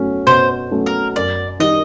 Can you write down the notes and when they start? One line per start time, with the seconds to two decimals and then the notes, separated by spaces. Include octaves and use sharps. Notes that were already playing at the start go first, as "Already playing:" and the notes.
Already playing: F#3 A3 C#4
0.27 B2 C5
0.71 F#3 A3 C#4
0.86 A#4
1.16 F#2 D5
1.60 D#3 G3 D#5